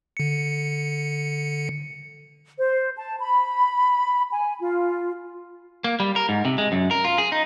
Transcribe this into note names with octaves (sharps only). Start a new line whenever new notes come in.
D3 C#7
C5
A5
B5
G#5
F4
A#3
G3
A#4
G#2
C3
G#3
F#2
A#4
F4
G#4
D#4